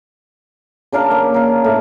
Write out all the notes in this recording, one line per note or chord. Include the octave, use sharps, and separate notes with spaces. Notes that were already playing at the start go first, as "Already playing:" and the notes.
C#3 D4 A#4 F5
A#3
A#4 F5
A2